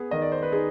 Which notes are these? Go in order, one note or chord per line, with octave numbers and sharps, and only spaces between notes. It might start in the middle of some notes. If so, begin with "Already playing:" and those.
Already playing: B3 G#4
D#3 D#5
D5
C5
B4
D#4 G#4